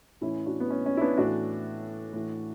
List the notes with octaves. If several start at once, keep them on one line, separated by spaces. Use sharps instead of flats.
A2 E3 C#4 E4
D4 F#4
B3
C#4
C#4
E4
B3 D4
A2 E3 D4 F#4
A2 E3